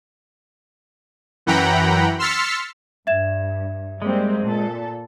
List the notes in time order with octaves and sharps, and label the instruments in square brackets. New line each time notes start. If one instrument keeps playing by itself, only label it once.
[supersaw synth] F#2 E3 F#5 G5 A#5 B5
C6 E6 F6 A6 B6 C#7
[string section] G2 [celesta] E5 G#6 E7
[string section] G3 A#3 C4 [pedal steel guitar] G#3
[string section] A#2 A4